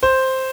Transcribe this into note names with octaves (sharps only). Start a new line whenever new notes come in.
C5